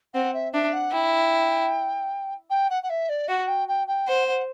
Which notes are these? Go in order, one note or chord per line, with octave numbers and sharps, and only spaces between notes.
C4 F#5
E5
D4 E5
F#5
E4 G5
G5
F#5
F#5
E5
D5
F#4 F#5
G5
G5
G5
C5 F#5
F#5